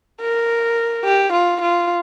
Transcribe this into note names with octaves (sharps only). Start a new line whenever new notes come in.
A#4
G4
F4
F4